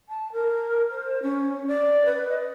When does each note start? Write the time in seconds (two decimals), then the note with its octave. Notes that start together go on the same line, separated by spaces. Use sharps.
0.09 A5
0.33 A#4
0.90 C5
1.23 C#4
1.67 D5
2.05 B4
2.29 D#5